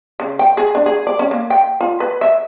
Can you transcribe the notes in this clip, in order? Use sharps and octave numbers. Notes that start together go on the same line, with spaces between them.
C#3
G5
G#4
D4
G#4
D5
C#4
A#3
G5
F4
B4
E5